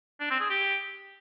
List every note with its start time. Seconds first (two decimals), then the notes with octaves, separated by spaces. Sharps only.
0.20 D4
0.30 C4
0.40 G#4
0.50 G4